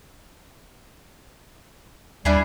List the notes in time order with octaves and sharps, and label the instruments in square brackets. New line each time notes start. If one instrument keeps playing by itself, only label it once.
[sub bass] D#2 [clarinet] G3 [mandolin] D4 E4 G#4